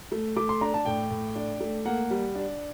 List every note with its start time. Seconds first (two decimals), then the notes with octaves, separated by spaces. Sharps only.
0.12 A3
0.36 A3 D6
0.49 C6
0.61 D4 A#5
0.74 A5
0.85 A2 G5
1.11 A2
1.36 D4
1.60 A3
1.85 A#3 F#5
2.10 G3
2.35 D4